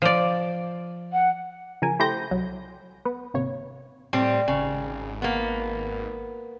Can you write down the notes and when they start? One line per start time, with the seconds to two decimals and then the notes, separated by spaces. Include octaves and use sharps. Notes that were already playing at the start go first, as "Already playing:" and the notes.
0.02 F3 D5
1.12 F#5
1.82 C#3 F3 A#4 G#5
1.99 A3 E4 G4 C5 G6 A#6
2.31 C2 F#3
3.05 B3
3.34 G#1 C3 A#3 C#5
4.13 A2 G3 C4
4.48 G#1 C#3
5.22 A#3 B3